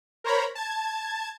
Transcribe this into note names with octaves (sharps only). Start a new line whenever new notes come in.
A#4 C5 C#5 A#5 B5
A5 G#6